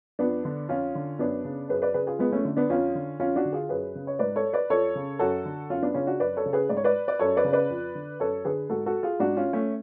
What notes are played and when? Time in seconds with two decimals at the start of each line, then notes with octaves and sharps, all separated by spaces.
0.19 F2 B3 D4
0.45 D3
0.69 F2 C#4 F4
0.95 D3
1.19 F#2 B3 D4
1.44 C#3
1.69 F#2 G#4 B4
1.82 B4 D5
1.94 C#3 G#4 B4
2.07 F4 G#4
2.19 F2 G#3 B3
2.32 A3 C#4
2.45 D3
2.57 B3 D4
2.70 F2 C#4 F4
2.95 D3
3.19 F2 C#4 F4
3.36 D4 F#4
3.45 D3
3.53 F4 G#4
3.69 F#2 G#4 B4
3.95 C#3
4.07 C#5
4.19 G#2 B4 D5
4.36 A4 C#5
4.53 B4 D5
4.70 F2 A4 C#5
4.95 C#3
5.19 F#2 F#4 A4
5.45 D3
5.70 F#2 C#4 F4
5.82 B3 D4
5.94 C#3 C#4 F4
6.07 D4 F#4
6.20 F#2 B4 D5
6.37 A4 C#5
6.46 C#3
6.53 G#4 B4
6.69 G#2 D5
6.77 C#5
6.84 B4 D5
7.08 D5
7.19 F#2 A4 C#5
7.37 B4 D5
7.44 C#3
7.53 B4 D5
7.70 F2
7.95 D3
8.20 F#2 A4 C#5
8.45 D3 G#4 B4
8.70 G#2 F#4 A4
8.86 F#4 A4
9.03 F4 G#4
9.20 G#2 D4 F#4
9.37 C#4 F4
9.53 A3 C#4